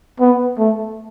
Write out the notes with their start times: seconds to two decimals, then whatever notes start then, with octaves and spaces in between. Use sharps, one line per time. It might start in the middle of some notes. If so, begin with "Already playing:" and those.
0.20 B3
0.58 A3